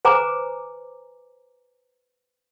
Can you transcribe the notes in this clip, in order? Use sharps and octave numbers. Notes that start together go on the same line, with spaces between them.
B4 C5 G#5 A#5 D6